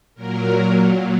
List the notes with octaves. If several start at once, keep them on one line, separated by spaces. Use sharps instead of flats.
A#2 F#3 A#4